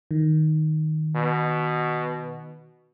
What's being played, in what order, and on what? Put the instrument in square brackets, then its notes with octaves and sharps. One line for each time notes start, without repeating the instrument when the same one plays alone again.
[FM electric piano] D#3
[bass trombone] B2